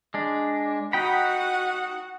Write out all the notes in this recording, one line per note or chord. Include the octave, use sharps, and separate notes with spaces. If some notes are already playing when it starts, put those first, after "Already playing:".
G#3 D4
D#4 F#4 F#5 G5 B5